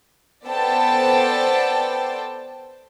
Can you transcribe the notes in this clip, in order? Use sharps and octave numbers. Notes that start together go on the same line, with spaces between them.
B3 A4 C5 D5 G5 A5